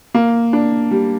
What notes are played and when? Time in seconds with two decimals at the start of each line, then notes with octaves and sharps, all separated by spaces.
0.15 A#3
0.53 D4
0.91 G3